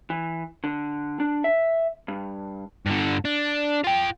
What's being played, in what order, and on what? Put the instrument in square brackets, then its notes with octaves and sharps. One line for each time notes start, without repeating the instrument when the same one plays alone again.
[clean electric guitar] E3
D3
D4
E5
G2
[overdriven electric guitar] G2 D3
D4
F4 G5